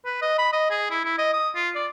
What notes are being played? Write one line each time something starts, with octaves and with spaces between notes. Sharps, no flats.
B4
D#5
B5
D#5
G#4
E4
E4
D#5
D#6
F4
D5